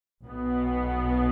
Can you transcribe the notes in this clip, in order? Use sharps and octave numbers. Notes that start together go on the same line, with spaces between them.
B1 B2 B3